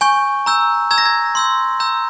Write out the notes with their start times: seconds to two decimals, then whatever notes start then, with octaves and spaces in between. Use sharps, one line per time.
0.01 G#5 C#6 G6
0.46 A#5 E6 G6
0.91 A#5 E6 G6 G#6
0.98 A#6
1.06 G#6
1.35 C6 E6 G6
1.80 A#5 E6 G6